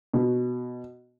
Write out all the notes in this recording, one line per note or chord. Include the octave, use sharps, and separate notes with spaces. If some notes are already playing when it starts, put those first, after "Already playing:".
B2